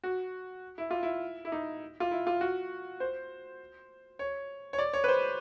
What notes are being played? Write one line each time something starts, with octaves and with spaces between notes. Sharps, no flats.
F#4
E4
F4
E4
E4
D#4
F4
E4
F4
F#4
C5
C#5
C#5
D5
C#5
B4
C5